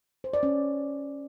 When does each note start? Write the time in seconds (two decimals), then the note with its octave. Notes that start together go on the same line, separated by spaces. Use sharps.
0.24 C5
0.33 D5
0.43 C#4